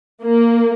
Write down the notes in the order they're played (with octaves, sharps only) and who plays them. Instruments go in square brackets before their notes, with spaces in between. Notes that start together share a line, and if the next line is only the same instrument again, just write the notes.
[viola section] A#3